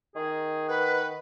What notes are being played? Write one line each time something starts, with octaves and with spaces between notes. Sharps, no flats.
D#3 G#4
B4 F#5